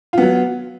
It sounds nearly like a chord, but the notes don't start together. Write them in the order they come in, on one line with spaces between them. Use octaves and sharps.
F4 B3 F#3